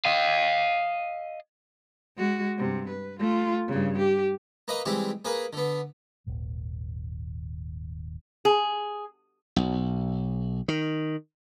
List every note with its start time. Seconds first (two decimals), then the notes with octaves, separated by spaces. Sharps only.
0.05 D#5 F5
2.16 G#3 F#4
2.58 G2 C3
2.89 B4
3.20 A3 F4
3.68 G2 C#3
3.98 G4
4.68 A#3 B4 D#5 A#5
4.85 E3 G3 G#3 C4 G4
5.25 A#3 G#4 A#4 B4
5.53 D3 B3
6.27 D#1 G#1
8.45 G#4
9.56 B1
10.68 D#3